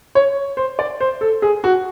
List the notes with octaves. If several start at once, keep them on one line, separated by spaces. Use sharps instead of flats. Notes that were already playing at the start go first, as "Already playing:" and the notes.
C#5
C5
D5
C5
A4
G#4
F#4